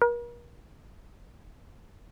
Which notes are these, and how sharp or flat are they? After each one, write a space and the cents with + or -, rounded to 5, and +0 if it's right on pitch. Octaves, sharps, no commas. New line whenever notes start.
A#4 +45